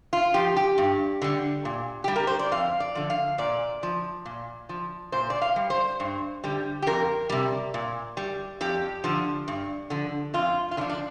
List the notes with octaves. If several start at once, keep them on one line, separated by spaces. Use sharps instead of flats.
F4
F3 G4
G4
G2
D3 G3
A#2
G3 G4
A#4
C5
D5
F2 F5
D5
D3 F3
F5
A#2 D5
F3
A#2
F3
A#2 C5
D5
F5
G3
C5
G2
D3 G3
G4
F2 A#4
C3 G3
A#2
G3
F2 G4
D3 F3
G2
D3 F3
F2 F4
F4
D3 D4
F3
D4